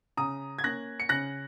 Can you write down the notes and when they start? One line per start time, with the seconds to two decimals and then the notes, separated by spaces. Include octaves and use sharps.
0.17 C#3 A#5 D#6
0.59 G#6
0.64 A#3 C#4 F#6 A#6
1.00 C#7
1.09 C#3 F#6 A#6